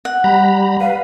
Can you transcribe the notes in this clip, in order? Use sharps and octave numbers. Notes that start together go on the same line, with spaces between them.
F#5
G3 A#5 B5
B4 F5